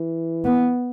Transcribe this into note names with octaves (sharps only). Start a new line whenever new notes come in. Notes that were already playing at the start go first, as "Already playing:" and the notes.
Already playing: E3
B3